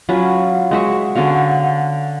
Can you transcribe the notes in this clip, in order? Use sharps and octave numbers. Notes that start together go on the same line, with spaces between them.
F#3 C#4 F4 B4
G#3 F#4 E5 C#6
D3 C#4 F#4 F5